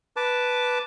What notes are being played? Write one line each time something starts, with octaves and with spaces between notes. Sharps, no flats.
B4 A5 D6